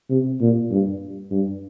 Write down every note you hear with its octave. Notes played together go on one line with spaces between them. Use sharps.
C3
A#2
G2
G2